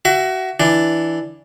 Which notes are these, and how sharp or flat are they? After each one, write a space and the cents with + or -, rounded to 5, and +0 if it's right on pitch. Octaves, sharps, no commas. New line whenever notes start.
F#4 +25 E5 +30
E3 +0 D4 +0